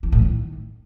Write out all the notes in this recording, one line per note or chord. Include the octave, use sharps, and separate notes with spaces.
E3
A2
D#3